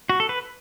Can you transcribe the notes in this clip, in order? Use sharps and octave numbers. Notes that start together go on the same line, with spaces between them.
F#4
A4
B4